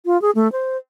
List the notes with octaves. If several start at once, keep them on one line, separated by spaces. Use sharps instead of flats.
F4
G#4
A3
C5